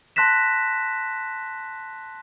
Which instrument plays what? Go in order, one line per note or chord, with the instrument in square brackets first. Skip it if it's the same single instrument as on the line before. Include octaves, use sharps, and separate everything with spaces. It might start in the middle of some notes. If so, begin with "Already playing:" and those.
[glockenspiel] A5 C6 F#6 A#6 B6 E7